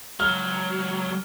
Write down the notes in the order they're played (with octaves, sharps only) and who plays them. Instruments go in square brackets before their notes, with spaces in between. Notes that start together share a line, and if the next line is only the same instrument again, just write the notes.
[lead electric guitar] C#2 F#3 [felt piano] F6